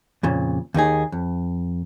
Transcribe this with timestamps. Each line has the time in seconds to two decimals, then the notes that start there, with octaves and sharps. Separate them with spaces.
0.23 F2 A#2 C#3
0.74 D#2 D#3 D#4 G#4
1.12 F2